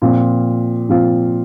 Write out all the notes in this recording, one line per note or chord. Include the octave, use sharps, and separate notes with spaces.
A#2 F3 C4 F4
A#2 F3 C4 F4